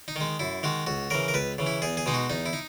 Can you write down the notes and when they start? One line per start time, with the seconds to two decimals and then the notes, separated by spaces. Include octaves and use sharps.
0.08 D#4
0.16 D#3 G#3
0.39 F#2 E4
0.63 D#3 G#3 F#4
0.87 C#2 F#4
1.10 C#3 E3 A#4
1.28 A#4
1.34 C#2 B4
1.58 C#3 E3
1.66 E4
1.82 E2 G#4
1.97 G#4
2.06 B2 G#3 D#4
2.14 F#4
2.30 E2 D#4
2.46 E4
2.53 D#4